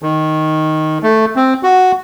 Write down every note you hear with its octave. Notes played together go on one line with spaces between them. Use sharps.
D#3
A3
C4
F#4